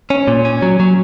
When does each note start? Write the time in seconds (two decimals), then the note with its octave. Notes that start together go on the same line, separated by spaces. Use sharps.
0.10 C#4
0.28 A#2
0.45 C#4
0.62 F#3
0.80 F#3